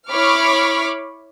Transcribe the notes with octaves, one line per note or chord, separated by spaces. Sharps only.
E4 C#5 B5 C#6 D6 F6